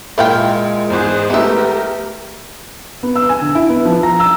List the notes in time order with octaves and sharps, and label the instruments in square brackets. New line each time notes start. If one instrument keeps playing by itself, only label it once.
[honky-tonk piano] A#2 [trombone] G#3 [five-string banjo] E4 F5 G5
[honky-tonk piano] E2 G#2 [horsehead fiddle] G#4 C5
[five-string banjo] E3 E5 [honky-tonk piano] A3 B3 [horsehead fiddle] G4 A#4
[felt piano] B3
E6
G#5
D3
E4
B3
F3
A#5
E6